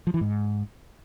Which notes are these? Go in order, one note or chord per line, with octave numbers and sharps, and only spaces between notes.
F3
E3
G#2